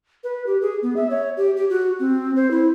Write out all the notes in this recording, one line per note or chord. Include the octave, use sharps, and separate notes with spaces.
B4
G4
G#4
B3
E5
C#5
G4
G4
F#4
C4
C5
E4